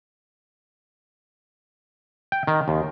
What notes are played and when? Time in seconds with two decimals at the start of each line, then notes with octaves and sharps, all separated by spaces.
2.32 G5
2.47 D#3
2.68 D#2